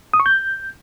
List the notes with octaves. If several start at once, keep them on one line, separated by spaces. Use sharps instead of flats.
D#6
C#6
G6